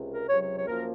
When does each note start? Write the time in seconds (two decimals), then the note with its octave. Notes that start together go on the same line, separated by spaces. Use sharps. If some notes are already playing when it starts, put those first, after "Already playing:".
Already playing: C#2 C3
0.10 A#4
0.29 C#2 C3 F#3 C#5
0.42 C#5
0.55 C#5
0.67 F#2 F3 A#3 A#4